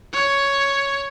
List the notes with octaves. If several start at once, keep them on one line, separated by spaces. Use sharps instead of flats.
C#5